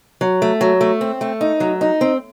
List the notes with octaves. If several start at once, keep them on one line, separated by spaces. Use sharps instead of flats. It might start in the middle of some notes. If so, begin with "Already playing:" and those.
F#3
A3
F#3
A3
C4
A3
D#4
F#3
D#4
C4